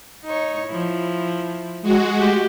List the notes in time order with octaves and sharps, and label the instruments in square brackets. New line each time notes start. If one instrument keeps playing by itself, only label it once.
[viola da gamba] D#4 C#5
F3 E4
[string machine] G#3 F#4
[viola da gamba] A3 G4